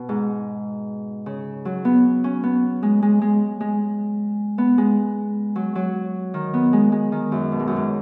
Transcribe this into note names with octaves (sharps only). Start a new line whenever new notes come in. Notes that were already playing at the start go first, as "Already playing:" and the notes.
Already playing: B2
G#2
C#3
F#3
B3
C#4
B3
G#3
G#3
G#3
G#3
B3
G#3
F#3
F#3
D#3
B3
G#3
G#3
D#3
F#2
B2
G#2
F#2
G#2